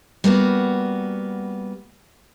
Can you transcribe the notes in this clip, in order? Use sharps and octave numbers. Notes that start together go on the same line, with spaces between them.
G3 A#3 B3 F#4